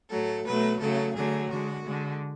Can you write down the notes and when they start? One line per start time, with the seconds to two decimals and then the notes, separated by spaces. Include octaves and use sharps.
0.11 A2 F#3 A3 A4
0.46 B2 F#3 A3 B4
0.80 C#3 F#3 A3 A4
1.15 D3 F#3 A3 G#4
1.49 D3 G#3 F#4
1.84 D3 G#3